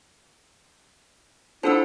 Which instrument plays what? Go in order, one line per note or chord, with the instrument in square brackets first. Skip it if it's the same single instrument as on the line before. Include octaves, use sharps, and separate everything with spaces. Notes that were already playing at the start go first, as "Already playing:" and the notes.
[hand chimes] D4 F4 C5 [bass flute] E4 [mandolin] A4 F#5 E6